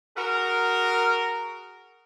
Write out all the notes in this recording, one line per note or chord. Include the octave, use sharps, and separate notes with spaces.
F#4 G#4 A#4